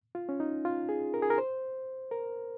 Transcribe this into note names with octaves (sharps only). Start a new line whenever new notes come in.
F4
C#4
D#4
F4
G#4
A#4
G#4
A#4
C5
A#4